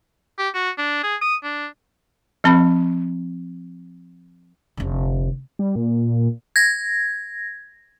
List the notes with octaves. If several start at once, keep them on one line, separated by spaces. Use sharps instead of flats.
G4
F#4
D4
G#4
D#6
D4
F3 C4 B5
F1 D3
G3
A#2
G#6 A#6